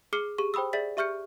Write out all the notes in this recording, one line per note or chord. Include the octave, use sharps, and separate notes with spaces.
G#4 D6 F6 C7 C#7 G7
G4 G#4 C#6
C5 G5 B5 D#6 E6
G#4 D5 E5 A6 B6 F#7
G4 E5 C#6 F6 G6 C#7